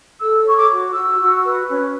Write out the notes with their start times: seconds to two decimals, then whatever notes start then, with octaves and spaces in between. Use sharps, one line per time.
0.19 A4 E6
0.44 C#5 C#6
0.56 D6
0.69 F#4
0.93 F#4 E6
1.19 F#4
1.44 B4
1.69 C#4